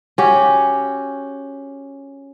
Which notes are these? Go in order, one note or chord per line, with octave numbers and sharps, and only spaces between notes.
C#4 F#4 G4